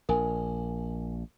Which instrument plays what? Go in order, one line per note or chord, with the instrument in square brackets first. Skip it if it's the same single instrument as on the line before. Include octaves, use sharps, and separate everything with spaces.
[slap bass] A#1 [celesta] A#4 G#5